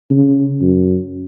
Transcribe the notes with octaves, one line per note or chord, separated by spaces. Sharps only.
C#3
F#2